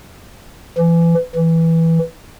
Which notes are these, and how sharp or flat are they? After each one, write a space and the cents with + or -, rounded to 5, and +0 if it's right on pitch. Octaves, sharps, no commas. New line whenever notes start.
E3 +30
E3 -5